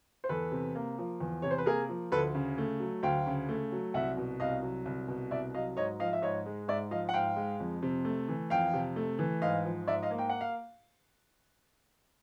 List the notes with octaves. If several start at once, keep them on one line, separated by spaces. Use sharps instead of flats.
C5
E2 A4 B4
C3
A#3
F3
E2
C3 C#5
C5
B4
A#3 G#4 A#4
F3
D2 A4 B4
C#3
A3
F#3
D2 F5 G5
C#3
A3
F#3
C2 E5 F#5
B2
C2 D#5 F5
F#3
C2
B2
C2 D5 E5
F#3 D#5 F5
G#2 C#5 D#5
F3 D#5 F5
E5
G#2 C#5 D#5
G#3
G#2 D5 E5
F3 D#5 F5
F#5
G#2 F5 G5
G#3
F2
C3
A3
E3
F2 F5 G5
C3
A3
E3
G#2 D#5 F5
F3
G#2 D5 E5
D#5 F5
A#3
G5
F#5
F5